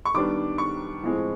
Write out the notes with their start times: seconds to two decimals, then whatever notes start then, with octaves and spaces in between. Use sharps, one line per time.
0.05 C#6
0.14 D#3 G3 B3 D4 D6
0.58 C#6
1.03 A2 F3 G#3 C4